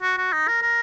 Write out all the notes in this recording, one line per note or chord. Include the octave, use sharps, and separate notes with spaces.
F#4
F#4
D#4
A#4
A#4